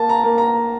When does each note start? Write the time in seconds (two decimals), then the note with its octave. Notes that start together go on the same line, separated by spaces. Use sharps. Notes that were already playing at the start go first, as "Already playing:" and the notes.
Already playing: A#3 A5
0.09 A#5
0.23 A#3
0.38 A#5